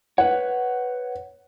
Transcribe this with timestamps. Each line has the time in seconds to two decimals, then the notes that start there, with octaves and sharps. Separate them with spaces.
0.18 B4 C#5 F#5